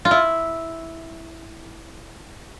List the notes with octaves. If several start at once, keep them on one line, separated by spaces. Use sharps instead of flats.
F4
E4